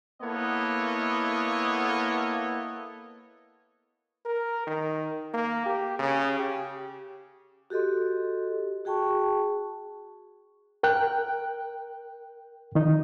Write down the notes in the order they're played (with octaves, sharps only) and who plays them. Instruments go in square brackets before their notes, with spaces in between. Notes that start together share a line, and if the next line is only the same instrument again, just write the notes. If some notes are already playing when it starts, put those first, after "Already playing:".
[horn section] A#3 B3 E4 A4 C#5 D#5
[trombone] A#4
D#3
A#3
G4
C#3
G4
[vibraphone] F#4 G4 A4 D#5 C6
F#4 G#4 G5 A5 C#6
[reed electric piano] A#4 G5 F#6
D#3 D#4